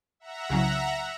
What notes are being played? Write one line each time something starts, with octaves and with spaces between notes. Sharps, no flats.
E5 F#5 A#5
C2 C#3 F#3